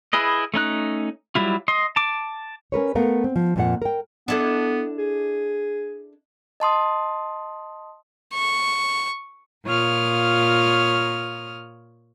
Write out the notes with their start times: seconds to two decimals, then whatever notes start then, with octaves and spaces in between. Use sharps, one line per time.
0.13 E4 G#4 B4 D#5
0.54 A3 C#4 D#4 F#6
1.35 F#3 G3 E4 F4
1.68 D#5 C6
1.96 A5 D6
2.72 C#4 A#4 B4 C#5
2.95 A3 B3 A#4 F5
3.24 C4
3.36 F3
3.56 F2 A#2 F#5
3.82 A#4 G5
4.28 B3 D4 E4 A4
4.98 G#4
6.60 D#5 A5 C6 D#6
8.34 C#6
9.66 A#2 F4 C#5 D#6 F6